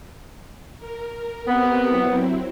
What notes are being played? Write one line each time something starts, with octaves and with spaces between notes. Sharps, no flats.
A#4
B3 C4 G4 A#4
F#3 C4 E4